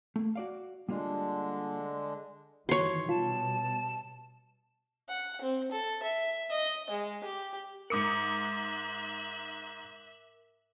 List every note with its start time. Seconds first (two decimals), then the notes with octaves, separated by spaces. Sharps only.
0.16 A3 A#3
0.36 F#4 D5 F5
0.89 D3 G3 G#3 A#3 D4 F4
2.69 G2 D#3 E3 F#4 C#5 C6
3.09 B2 G3 F4 A5
5.09 F#5
5.41 C4
5.71 A4
6.03 E5
6.52 D#5
6.90 G#3
7.24 G4
7.90 G#2 A#4 E5 D6 D#6 F#6 C#7